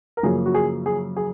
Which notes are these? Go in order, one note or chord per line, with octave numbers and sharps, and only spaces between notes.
A#4
F#2 C#3 F3 A#3 G#4
F#4
G#4
G#4
G#4